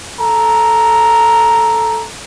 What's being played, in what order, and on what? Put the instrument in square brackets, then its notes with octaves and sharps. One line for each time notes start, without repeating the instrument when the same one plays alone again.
[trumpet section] A4 A#5